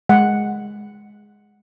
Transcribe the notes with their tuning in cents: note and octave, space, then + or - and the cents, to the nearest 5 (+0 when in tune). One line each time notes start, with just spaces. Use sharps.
G#3 +0 F#5 +0